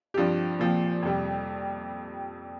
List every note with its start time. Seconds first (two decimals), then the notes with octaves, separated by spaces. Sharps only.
0.14 G2 F3 C4 G4
0.59 A#2 F3 C4
1.03 F2 C3 G3